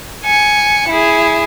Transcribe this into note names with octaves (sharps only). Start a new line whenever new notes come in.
G#5 C#7
E4 G#4